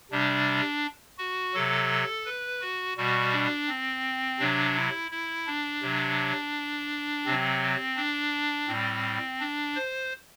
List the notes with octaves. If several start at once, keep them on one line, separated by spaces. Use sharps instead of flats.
C3 G3 D4
F#4
C3 F#3 A4
B4
F#4
B2 G3 F#4
D4
C4
C3 F#3 D4
E4
E4
D4
C3 F#3
C3 F#3 C4
D4
A2 G3 C4
D4
C5